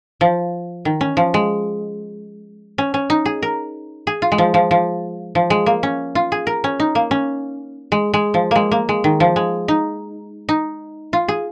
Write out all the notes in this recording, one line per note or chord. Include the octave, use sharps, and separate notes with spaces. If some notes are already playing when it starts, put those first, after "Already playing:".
F3
D#3
C#4
F3
G#3
C#4
C#4
D#4
G#4
A#4
G#4
F4
G#3
F3
F3
F3
F3
G#3
A#3
C#4
F4
G#4
A#4
C#4
D#4
A#3
C#4
G#3
G#3
F3
G#3 A#3
A#3
G#3
D#3
F3
G#3
D#4
D#4
F4
G#4